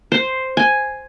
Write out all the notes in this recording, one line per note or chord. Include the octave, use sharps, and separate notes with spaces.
C5
G#5